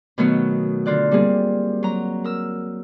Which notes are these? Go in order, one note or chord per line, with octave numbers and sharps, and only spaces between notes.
B2 D#3 F#3 A3 B3 F#4
D3 F4 D5 F#6
G3 A#3 C4 G#4
F#3 A#5
A#4 E6